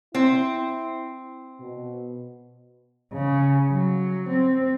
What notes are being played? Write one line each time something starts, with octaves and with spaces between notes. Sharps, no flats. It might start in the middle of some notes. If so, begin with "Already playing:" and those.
C4 E4
B2
C#3
F#3
C4